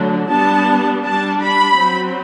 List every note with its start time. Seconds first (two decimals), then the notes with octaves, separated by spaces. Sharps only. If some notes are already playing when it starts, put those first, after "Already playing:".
Already playing: D3 F#3 A3 D4
0.31 G3 B3 D4 A5
1.05 G3 D4 A5
1.42 B5
1.79 F#3 C4